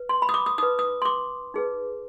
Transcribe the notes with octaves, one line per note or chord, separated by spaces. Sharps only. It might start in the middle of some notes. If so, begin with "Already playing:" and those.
Already playing: B4
C6
B5
D#6
D6
D#6
D#4 B4 D#6
D#6
C6
D6
D#4 G#4 B4